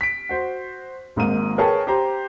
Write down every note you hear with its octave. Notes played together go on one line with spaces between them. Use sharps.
B6 D7
F#4 C5
G#1 G#2 A#3 D#7
G#4 A#4 B4 C#5 G5 A5
G4 C5 A#5